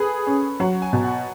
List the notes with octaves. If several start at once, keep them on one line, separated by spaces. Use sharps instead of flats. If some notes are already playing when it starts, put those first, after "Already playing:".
Already playing: G#4 A4 B4
C#4
F#3 F#5
G#5
B2
F#5